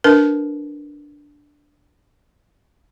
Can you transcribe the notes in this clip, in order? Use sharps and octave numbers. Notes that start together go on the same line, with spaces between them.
D4 A#4 B4